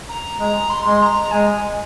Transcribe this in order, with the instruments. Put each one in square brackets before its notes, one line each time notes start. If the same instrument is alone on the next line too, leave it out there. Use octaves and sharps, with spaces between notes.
[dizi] A#5
[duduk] G#3 [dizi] A#5
[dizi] C6
[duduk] G#3
[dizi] A#5
[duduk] G#3 [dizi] G#5